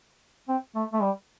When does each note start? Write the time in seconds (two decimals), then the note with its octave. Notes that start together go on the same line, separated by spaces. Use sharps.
0.49 C4
0.75 A3
0.93 A3
1.02 G3